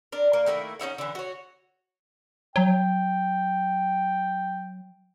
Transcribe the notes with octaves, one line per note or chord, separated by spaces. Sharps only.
D4 A#4
A#3
D#3 A3 A#3 E4
C#4 D#4 E4 F#5
D3 E3
F#4 C#5
F#3 G5